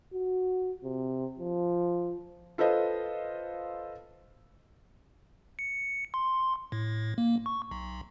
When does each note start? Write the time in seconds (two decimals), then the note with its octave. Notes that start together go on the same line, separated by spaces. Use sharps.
0.14 F#4
0.84 C3
1.39 F3
2.58 F4 A4 B4 C5 D#5
5.59 C#7
6.14 C6
6.72 A2
7.18 A#3
7.46 C#6
7.71 B1